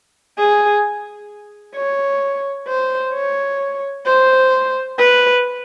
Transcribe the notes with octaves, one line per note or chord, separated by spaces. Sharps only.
G#4
C#5
C5
C#5
C5
B4